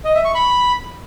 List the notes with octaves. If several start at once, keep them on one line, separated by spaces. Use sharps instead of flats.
D#5
E5
C#6
B5